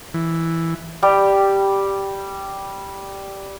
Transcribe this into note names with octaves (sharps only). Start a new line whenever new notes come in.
E3
G3 G4 G5